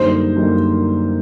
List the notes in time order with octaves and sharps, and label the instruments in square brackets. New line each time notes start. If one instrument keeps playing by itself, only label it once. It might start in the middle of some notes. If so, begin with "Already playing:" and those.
Already playing: [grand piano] F#2 D3 G3 A#3 D#4 [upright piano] C5
[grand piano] F#2 D3 G3 A#3 D#4